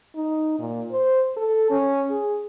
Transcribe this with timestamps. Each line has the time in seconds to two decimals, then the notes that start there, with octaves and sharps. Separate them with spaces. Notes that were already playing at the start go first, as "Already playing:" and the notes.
0.16 D#4
0.59 A#2
0.92 C5
1.37 A4
1.70 C#4
2.10 G#4